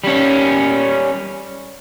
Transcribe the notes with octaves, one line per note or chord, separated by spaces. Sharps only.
G3 C#4